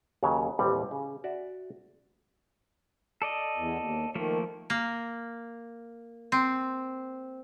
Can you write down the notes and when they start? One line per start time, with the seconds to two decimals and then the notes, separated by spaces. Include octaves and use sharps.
0.23 D#2 C#3 F#3 C#5
0.59 A1 D#2 G3 C4 G4 F#5
0.91 C#3
1.24 F#4 D5 E5
3.22 A4 D5 D#5
3.57 E2
3.79 D#2
4.15 D#3 F3 A3 A#3
4.70 A#3
6.32 C4